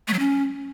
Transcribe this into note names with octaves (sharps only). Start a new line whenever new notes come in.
A3
F#3
C#4